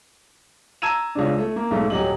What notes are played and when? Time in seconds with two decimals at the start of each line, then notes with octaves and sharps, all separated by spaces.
0.82 A5 A#5 E6 G#6 D#7 E7
1.15 C#2 C#3 D4
1.38 A3
1.56 A#3
1.71 B1 G#2 G#3 A3
1.90 D#1 F#3 G4 D#5 F#7